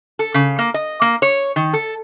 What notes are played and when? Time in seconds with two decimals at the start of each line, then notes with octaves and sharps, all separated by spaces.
0.19 A4
0.34 C#3
0.59 A#3
0.74 D#5
1.02 A#3
1.22 C#5
1.56 D#3
1.73 A4